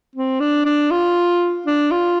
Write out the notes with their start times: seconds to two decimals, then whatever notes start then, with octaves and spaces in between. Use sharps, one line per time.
0.16 C4
0.40 D4
0.65 D4
0.91 F4
1.66 D4
1.91 F4